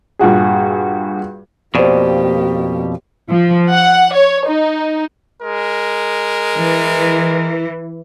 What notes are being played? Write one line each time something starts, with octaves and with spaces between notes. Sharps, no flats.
G2 A#2 F#4 G#4
F2 B2 A#3 G4 C5 D5
F3
F#5
C#5
D#4
G#3 A#4
E3